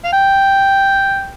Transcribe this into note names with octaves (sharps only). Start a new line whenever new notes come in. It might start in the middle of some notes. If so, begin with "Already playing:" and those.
F5
G5